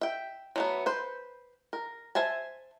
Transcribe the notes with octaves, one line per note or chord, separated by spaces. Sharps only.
E5 G5
F#3 A3 B3
B4 C5
A#4
C5 E5 G#5 A5